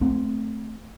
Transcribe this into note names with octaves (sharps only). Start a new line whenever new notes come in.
A3 C4